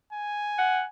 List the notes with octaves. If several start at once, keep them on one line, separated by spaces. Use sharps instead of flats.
G#5
F#5